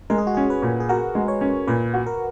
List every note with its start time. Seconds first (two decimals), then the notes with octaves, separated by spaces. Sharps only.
0.10 G#3 A#4
0.18 G#4
0.27 F#4
0.34 C#4 G#4
0.50 B4
0.62 A#2
0.80 G#4
0.89 F#4 A#4
1.15 G#3
1.28 C#5
1.41 C#4
1.68 A#2 B4
1.93 F#4
2.06 A#4